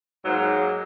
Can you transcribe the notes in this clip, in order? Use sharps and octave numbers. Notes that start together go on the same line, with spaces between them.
G#2 F#3 A#3